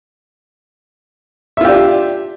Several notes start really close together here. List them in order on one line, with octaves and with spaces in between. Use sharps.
E5 F4 G4 D4